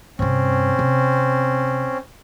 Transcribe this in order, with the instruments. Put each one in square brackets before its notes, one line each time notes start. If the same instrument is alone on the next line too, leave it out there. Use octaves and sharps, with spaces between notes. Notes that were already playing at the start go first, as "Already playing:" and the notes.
[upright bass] G2 C3 [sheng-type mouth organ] C4 C#4
[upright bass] C3